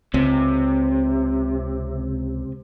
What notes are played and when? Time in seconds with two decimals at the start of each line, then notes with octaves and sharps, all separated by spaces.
0.14 C#2 C3